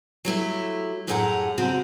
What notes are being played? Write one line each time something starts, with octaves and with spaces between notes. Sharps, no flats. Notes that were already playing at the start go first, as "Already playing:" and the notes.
F#3 A3 E4 G4
F#2 A2 G4 G#4 F#5 A#5
F2 C#3 C4 F#4 A#5